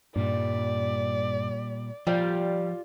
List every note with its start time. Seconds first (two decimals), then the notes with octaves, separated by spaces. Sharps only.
0.16 G2 A#2 G3 D5
2.07 F3 G3 F4 D5